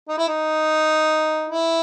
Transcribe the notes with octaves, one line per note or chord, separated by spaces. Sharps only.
D#4
E4
D#4
E4